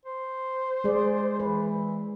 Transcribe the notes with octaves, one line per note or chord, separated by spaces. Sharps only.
C5
G#3 G#4 D5
E3 B4